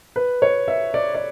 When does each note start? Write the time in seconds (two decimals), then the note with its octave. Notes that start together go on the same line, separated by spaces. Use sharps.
0.16 B4
0.42 C#5
0.68 E5
0.94 D5
1.15 D5